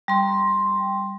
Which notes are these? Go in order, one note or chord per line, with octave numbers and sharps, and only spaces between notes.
G3 C6